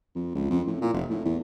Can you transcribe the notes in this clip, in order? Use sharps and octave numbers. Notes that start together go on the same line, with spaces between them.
F2
C#2
F2
A2
A#2
F1
A2
E2